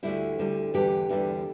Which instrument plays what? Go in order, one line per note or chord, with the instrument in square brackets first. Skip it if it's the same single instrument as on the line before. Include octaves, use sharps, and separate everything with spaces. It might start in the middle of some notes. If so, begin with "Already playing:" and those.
[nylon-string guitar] D2 D3 G3 E4
D2 D3 G3
E2 D3 G3 G4
E2 D3 G3